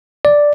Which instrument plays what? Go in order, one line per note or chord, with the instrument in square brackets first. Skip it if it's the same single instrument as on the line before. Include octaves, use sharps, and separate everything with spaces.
[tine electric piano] D5